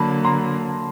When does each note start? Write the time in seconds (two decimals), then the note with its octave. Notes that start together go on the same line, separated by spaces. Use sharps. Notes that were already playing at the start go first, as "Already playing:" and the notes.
Already playing: D3 F#3 A#3 A5 B5
0.25 A#5 C6